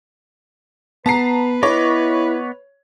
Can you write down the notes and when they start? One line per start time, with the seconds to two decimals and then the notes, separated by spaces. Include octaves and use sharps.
1.06 B3 B4 A5 A#5 C7
1.63 B3 E4 C#5 D#5 D6